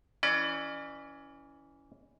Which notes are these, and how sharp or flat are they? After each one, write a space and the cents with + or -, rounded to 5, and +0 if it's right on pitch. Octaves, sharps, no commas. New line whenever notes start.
E3 +0 C#4 +20 D5 +40